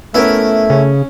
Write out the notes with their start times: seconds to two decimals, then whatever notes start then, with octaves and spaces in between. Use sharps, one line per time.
0.15 A3 B3 C#4 E4 A#4
0.70 C#3 C#4